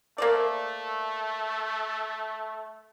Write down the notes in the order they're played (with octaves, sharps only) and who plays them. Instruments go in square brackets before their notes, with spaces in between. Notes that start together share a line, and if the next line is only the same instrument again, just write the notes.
[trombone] A3 [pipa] A#3 C5 D5